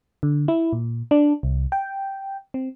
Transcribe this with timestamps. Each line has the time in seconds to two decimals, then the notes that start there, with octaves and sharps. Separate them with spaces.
0.23 D3
0.48 E4
0.73 A#2
1.11 D4
1.43 C2
1.72 G5
2.54 C4